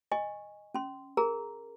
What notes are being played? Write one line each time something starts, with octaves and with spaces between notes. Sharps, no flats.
D#5 G#5 C#6
C#4 C6
G#4 A#4 A#5